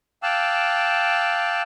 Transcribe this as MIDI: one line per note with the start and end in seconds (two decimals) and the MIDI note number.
0.23 1.62 77
0.23 1.62 79
0.23 1.62 81
0.23 1.62 86
0.23 1.62 88
0.23 1.62 90